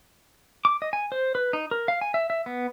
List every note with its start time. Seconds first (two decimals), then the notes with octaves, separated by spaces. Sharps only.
0.65 D6
0.82 D#5
0.93 G#5
1.12 C5
1.35 B4
1.53 D#4
1.71 A#4
1.88 F5
2.01 G#5
2.14 E5
2.30 E5
2.46 B3